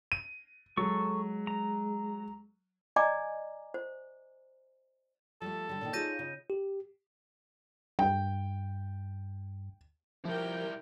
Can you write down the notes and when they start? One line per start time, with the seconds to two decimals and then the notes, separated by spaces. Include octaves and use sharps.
0.12 D#7
0.77 F#3 G#3 A4 C#6
1.47 A#5
2.96 D5 D#5 G#5 A#5 D6
3.74 C5
5.42 F3 G3 A3 A4
5.69 D3 G3
5.81 A#2 D3 D#3
5.93 D#4 F4 G#4 C#5 D5 G6 A#6 D#7
6.19 C#3
6.50 G4
7.99 G2 G5
10.25 F3 G3 E4 G4 A#4 G5